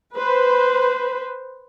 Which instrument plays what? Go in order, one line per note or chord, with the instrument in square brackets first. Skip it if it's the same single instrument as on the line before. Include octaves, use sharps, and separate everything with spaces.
[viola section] B4 C5